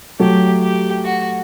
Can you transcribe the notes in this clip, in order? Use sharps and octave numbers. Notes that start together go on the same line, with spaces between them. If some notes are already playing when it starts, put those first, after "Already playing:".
F#3 A3 G4
G4
F#4